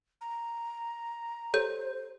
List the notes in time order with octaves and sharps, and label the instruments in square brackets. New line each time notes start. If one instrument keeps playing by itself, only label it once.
[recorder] A#5
[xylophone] G4 C#5 G6 [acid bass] A4 [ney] C5